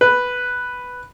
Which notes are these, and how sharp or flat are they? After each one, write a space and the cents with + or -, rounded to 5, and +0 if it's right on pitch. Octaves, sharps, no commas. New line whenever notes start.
B4 +0